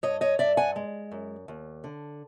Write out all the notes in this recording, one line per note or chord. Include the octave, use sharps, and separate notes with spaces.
G2 C#5 D#5
C#5 D#5
G2 D5 E5
F#5 G#5
G#3
F#2
D#2
D3